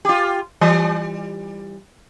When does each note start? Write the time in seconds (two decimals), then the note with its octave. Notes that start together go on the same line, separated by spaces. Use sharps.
0.05 F4 G4
0.61 E3 G3